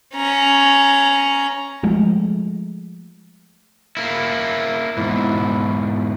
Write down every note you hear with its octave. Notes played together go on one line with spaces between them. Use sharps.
C#4 A#5
F3 G#3 A3
A#3 E4
E2 G#2 E4